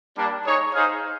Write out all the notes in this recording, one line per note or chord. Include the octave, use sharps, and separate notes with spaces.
G3 A#3 D4
D#4 G#4 C#5
D#4 G#4 C5 F5